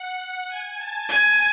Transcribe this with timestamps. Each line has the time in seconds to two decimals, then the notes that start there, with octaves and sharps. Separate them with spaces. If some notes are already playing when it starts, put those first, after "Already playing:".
Already playing: F#5
0.48 G#5
0.78 A5
1.09 G#5